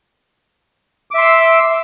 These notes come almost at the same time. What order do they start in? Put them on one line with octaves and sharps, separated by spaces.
D6 E5 C6 E6